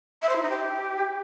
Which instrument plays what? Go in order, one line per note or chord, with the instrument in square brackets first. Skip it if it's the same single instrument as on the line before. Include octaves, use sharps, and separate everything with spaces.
[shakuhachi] E5
C5
E4
D#4
G4